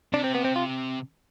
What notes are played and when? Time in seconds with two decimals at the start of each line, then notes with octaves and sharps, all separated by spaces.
0.13 C3 D4
0.24 C4
0.35 B3
0.45 C4
0.56 F4